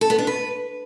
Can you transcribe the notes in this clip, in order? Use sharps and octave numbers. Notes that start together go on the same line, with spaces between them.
A4
B3
D4
B4